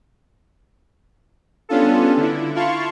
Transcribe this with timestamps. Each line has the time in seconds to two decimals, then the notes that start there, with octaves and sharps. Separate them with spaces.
1.69 G3 B3 C#4 D4 F4 A4
2.17 D3 E4
2.55 E4 F4 F5 A5 C6 C#6